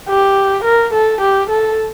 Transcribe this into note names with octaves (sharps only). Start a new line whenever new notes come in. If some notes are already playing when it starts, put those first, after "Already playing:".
G4
A#4
A4
G4
A4